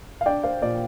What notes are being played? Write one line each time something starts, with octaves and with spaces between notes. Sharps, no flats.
F5
D4 D5 G5
C5 F5
A#2 D5